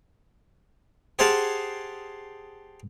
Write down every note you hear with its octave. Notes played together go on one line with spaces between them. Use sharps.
G4 G#4 C5 F5 F#5 A5